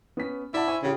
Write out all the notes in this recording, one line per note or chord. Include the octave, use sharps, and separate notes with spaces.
B3 C#4 B6
E4 D5 F#5 A5
C5 G#5 C#6
C#3 F4 G4 G#4